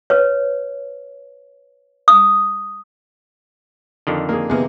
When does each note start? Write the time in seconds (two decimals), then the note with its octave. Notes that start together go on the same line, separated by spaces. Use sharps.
0.10 B4 C#5
2.08 D#6
4.07 F2 D3 D#3
4.29 A#3 G#4
4.50 C3 A#3 B3 G#4